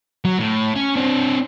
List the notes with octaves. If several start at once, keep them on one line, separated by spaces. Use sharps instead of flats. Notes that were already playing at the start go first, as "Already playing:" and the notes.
F#3
A2
C#4
C4 D4